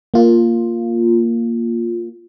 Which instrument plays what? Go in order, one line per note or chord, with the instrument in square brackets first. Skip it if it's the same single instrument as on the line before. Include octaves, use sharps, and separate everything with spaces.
[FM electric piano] A#3 F4